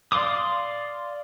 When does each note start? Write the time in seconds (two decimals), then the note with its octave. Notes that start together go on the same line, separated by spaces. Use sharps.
0.12 D5 F5 C6 D6 D#6